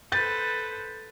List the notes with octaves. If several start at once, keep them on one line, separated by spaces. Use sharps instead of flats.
A4 B4 C5 G6 A6